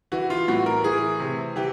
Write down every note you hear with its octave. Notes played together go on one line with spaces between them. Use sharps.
E3 F#4
F4
A2 F#4
A#4
E3 G#4
C3
E3 G4